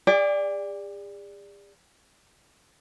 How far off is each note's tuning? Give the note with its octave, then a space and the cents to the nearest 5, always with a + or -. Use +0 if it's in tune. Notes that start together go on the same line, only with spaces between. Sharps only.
G#4 -45 D5 +0 G5 +25